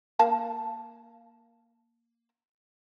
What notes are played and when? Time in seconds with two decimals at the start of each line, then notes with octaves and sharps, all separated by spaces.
0.19 A#3 F5 A5